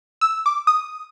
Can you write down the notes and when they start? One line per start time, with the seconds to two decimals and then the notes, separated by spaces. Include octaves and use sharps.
0.21 E6
0.46 D6
0.67 D#6